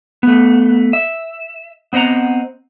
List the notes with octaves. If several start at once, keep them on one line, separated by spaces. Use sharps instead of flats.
A3 B3
E5
B3 C4 D#5 F#5 A#5